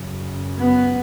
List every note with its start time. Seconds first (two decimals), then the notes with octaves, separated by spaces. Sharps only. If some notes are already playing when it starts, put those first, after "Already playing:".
Already playing: F#2 C#3
0.57 B3